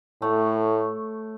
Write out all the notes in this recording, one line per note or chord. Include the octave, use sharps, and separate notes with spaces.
A2 A3 C#5